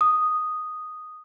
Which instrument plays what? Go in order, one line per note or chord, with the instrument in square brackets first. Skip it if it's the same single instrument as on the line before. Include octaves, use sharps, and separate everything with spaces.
[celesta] D#6